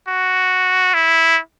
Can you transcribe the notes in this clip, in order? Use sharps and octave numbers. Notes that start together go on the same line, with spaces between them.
F#4
E4